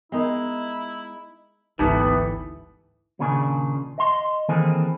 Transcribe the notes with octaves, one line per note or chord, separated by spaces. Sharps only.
G#3 B3 D#4 E4 A#4
G#1 D2 E3 G3 A3 B3 D#4 E4
D#2 A#2 C#3 A#3 D4 G#4
D#5 C6
D#3 E3 A#3 C4 G#4 A4